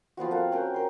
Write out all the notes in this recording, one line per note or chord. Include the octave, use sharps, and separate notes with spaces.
F3 B3 C4 F#4
F#4 A4 A#4 F5
C#4 F#4 A#4 G5
A#4 C6